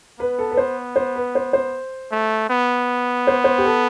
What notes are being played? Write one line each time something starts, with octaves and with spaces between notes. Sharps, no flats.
B3 B4
A4
B4
C5
C5
B4
C5
C5
A3
B3
C5
C5
G4
A4